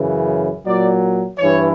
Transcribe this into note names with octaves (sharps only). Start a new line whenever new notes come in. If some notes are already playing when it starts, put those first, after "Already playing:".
Already playing: F#2 C#3 E3
A#2 F#3 D5
G2 E3 C#5